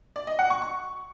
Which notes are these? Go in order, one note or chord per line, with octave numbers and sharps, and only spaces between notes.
D5
D#5
F#5
C#6
C#6